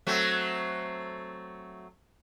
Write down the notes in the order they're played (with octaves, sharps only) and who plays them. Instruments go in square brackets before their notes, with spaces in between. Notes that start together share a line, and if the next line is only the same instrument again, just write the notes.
[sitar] F#3 A3 C4